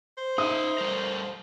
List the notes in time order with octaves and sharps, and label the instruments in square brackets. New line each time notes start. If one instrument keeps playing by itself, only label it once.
[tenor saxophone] C5
[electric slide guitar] D#4 E5 [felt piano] D#6
[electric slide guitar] G3 A4 A#4